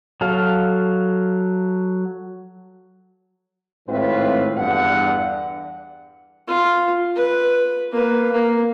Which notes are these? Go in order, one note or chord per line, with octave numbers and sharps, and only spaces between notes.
F#3 A4 F5
G#1 A2 E3 C4 F4 B4
E2 G2 D3 F#5
F4
B4
A#3 B4
A#3